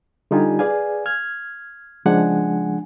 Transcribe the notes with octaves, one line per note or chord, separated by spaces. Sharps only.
D3 G3 D#4 F4 G4 G#5
G#4 B4 D5 F5 G#5
F6 G#6
C#3 F3 G#3 D4 F#5 G#5